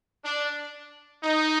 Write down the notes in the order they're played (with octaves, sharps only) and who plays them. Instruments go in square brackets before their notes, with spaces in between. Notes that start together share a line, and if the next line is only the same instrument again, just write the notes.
[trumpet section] D4
D#4